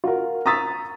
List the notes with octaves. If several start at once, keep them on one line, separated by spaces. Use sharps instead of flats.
F4 F#4 A#4
A#5 C#6 D#6 E6 A6 B6